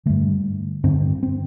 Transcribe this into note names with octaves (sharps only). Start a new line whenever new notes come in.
G2 D3 A3
G2 D3 C4
C4